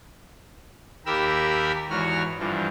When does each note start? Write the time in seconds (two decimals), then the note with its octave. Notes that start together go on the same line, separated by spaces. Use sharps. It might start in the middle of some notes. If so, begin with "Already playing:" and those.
1.06 D#2 G4 A#4 B5 E6
1.90 E2 G#2 F#4 C#5 F6
2.39 G2 D3 E3 F3